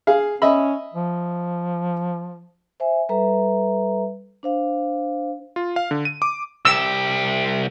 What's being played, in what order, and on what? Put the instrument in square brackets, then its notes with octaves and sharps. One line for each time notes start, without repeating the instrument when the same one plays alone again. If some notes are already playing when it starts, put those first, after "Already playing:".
[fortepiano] G#4 F5
[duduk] C#4 [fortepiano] D#5 E5 B5
[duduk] F3
[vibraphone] C5 E5 G#5
G3 A4 B4 E5 A#5
D4 C5 F5
[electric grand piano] F4
F5
D3
D#7
D6
[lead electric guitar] C2 G4 [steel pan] E6